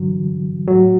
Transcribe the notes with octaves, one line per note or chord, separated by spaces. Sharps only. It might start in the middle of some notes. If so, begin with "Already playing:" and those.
Already playing: G2 D3 E3 F#3
A2 F#3 F#4